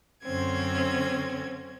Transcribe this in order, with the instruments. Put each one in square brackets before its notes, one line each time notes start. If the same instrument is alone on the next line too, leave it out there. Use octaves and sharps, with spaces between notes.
[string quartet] F#2 D3 C4 C#4 C5 G#6